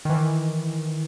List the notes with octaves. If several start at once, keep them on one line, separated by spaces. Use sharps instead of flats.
D#3 E3